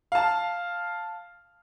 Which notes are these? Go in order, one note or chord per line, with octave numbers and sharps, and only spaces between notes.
F5 A5